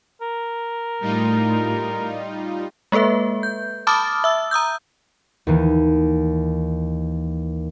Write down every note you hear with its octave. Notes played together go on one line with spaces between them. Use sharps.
A#4
A2 G3 D#4 F4
G#3 A#3 A4 B4 E5
G6
A5 B5 D6 D#6 F6 A6
E5 E6
A#5 D#6 E6 G6
D#2 D#3 E3